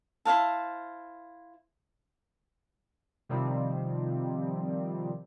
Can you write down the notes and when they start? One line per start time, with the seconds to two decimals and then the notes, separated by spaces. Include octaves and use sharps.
0.25 E4 C5 F5 A5
3.29 C3 D#3 F3 G3 C4